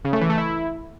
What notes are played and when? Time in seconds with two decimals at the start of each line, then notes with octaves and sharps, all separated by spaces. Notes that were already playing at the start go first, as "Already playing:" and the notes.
0.05 C#3
0.13 A3
0.21 E3
0.30 A3
0.38 E4